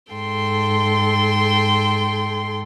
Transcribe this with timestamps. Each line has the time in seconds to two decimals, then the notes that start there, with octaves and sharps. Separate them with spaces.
0.12 G#2 A4 G5 C6